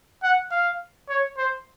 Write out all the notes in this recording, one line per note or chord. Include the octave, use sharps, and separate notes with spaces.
F#5
F5
C#5
C5